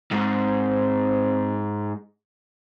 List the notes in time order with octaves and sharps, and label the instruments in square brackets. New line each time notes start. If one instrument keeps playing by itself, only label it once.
[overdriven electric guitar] G#2 [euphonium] C4